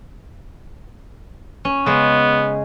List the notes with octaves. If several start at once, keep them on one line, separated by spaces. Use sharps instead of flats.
C#4
C#3 G#3 B3